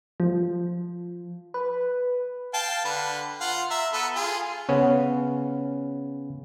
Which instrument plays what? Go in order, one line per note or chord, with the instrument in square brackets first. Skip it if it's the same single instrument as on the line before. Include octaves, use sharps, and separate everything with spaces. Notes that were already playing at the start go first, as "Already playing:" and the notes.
[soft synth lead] F3
B4
[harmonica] F5 G5 A5
D3 B4
F4 F5 F#5
E5 A#5
B3 A4 B4
F4 G#4
[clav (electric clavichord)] C#3 B3 C#4